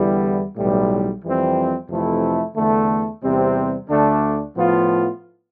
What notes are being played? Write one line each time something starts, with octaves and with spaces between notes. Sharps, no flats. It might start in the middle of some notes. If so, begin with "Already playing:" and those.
Already playing: E2 D3 G3 B3 E4
B1 A2 E3 G3
F2 E3 G3 C4
F2 C3 E3 A3 E4
E2 D3 A3
E2 C3 G3 C4
D2 D3 A3 D4
A2 F3 B3 F4